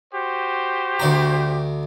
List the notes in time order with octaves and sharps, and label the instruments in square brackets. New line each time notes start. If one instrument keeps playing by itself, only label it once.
[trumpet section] F#4 G4 C5
[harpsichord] D2 D5 A#5